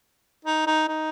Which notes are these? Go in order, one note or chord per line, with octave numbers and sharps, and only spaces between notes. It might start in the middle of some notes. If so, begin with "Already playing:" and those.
D#4
D#4
D#4